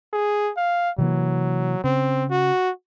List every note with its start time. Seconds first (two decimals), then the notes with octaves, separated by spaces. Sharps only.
0.13 G#4
0.57 F5
0.98 C3 E3 F#3 A#3
1.84 C#3 C4
2.30 F#4